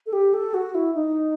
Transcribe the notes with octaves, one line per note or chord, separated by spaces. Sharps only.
A4
G4
A4
F#4
E4
D#4